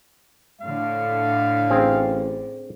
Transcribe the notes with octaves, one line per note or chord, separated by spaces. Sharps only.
A2 D3 F5
A1 C4 G#4